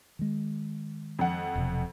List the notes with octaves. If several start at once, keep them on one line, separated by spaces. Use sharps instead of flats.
D#3 G#3
F2 F#5
E1 C3